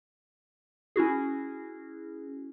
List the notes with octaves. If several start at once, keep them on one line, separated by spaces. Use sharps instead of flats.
C#4 E4 F#4 G#4